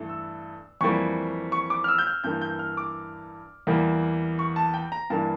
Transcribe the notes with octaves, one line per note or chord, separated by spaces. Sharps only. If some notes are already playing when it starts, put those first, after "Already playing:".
Already playing: G2 E3 A3
E6
F2 E3 G3 A#3 C#6
C#6
D6
F6
E6
G6
F6
G2 E3 A#3 G6
G6
F6
D6
E2 E3 G3 A#3
C#6
A5
G5
A#5
G2 E3 G3 A#3 A5